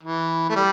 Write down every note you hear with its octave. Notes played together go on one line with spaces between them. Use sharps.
E3
A3
G3